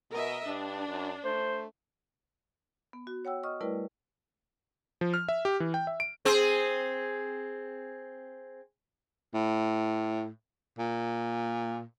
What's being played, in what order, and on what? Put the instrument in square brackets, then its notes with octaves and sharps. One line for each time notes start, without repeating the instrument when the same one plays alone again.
[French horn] B2 [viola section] A#4 D#5 E5
[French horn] G2 [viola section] D4
[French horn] F#2
[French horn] A3 [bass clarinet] C5
[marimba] B3
F#4
C#5 F#5 G5 E6
D#5 C#6 D#6 F6
G3 A3 E4 A#4 B4 D5
[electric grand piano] F3
F6
E5
G4
E3
G5
E5
D7
[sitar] C4 G#4 C5
[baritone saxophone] A2
A#2